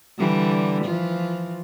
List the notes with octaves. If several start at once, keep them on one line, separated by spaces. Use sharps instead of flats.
D3 E3 G3
E3 F3 F4